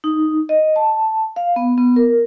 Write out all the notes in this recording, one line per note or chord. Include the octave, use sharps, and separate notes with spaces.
D#4
D#5
A5
F5
B3
B3
A#4